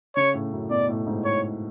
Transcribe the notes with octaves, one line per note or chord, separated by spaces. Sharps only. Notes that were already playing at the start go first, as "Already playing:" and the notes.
C#3 C#5
A2
F#2
B2 D5
A2
G#2
C#5